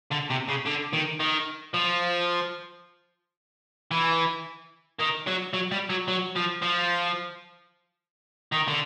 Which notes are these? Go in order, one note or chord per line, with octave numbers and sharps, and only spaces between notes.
D3
C3
C#3
D3
D#3
D#3
F3
E3
D#3
F#3
F#3
G3
F#3
F#3
F3
F3
D#3
D3